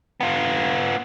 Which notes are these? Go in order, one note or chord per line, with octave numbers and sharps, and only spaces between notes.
B3 F4